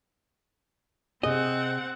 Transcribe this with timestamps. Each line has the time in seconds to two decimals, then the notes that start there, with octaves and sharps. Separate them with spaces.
1.23 C3 C4 G#4 D#5 F#5